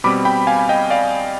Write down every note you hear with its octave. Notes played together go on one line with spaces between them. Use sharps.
B2 G3 C4 B5 D6
G5 B5
F5 G#5
G#5
D#5 G5
D5 F5